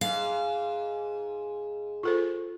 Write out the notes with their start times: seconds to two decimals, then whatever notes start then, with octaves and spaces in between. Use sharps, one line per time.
0.01 G#2 F5
2.03 F4 A4 C5